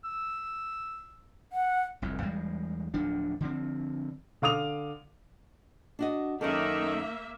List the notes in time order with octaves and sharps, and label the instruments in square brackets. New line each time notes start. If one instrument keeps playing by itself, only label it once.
[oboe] E6
[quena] F#5
[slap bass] F1 C2 F2
E2 G3 G#3
D1 F3 D4
D3 F3 C4
[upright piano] D3 F5 D6 D#6 F7
[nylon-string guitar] D4 F#4 D#5
[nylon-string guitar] F#2 C#4 A4 [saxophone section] D#3 [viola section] A#3 E5